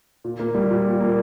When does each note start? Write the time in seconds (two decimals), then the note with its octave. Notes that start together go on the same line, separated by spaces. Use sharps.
0.24 A#2
0.39 A#3
0.55 G3
0.71 A#2
0.86 A#2
1.00 A#3